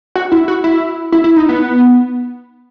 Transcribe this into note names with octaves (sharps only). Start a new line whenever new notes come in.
F#4
E4
F#4
E4
E4
E4
D#4
B3